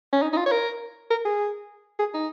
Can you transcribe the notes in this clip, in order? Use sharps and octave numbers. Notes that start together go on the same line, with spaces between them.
C#4
D#4
D#4
F4
C#5
A#4
A#4
G#4
G#4
D#4